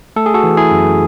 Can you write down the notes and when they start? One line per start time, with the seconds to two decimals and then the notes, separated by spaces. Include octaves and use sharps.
0.16 A3 A4
0.26 G#4
0.34 F#4 A4
0.43 E3
0.57 E4 G#4
0.71 F#2